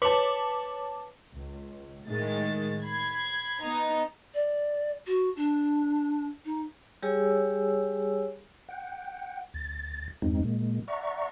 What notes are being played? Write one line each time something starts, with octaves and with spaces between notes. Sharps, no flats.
B4 C#5 A5 D6
C#2
A2 D#3 G#3 A6
B5 G#6 C7
B3 D#4
D5
F#4
D4
D#4
G3 G4 G#4 C#5 G#5 E6
F#5 G5
D2 A6
E2 G2 G#3 C4 D#4
A#2 G#3 A#3
D5 E5 F#5 A#5 C#6